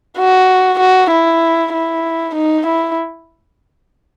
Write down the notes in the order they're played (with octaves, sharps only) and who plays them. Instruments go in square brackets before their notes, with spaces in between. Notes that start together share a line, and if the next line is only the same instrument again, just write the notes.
[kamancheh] F#4
F#4
E4
E4
D#4
E4